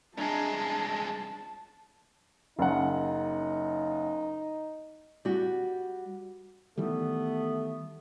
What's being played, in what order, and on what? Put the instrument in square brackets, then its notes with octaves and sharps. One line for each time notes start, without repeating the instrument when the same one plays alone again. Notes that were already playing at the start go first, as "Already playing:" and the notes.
[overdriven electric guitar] C2 G#3 [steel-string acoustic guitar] C#4 D4 A#5 [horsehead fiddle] A5
[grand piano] F#1 F#5 [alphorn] D#4
[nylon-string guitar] G3 F#4
[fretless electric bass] D#3 E3 G3 [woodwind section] A3 B3